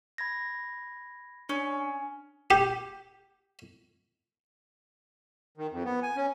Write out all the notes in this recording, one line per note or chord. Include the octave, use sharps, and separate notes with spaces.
B5 G#6 A#6
C#4 D4
G4
D#3
F2
B3
G#5
C#4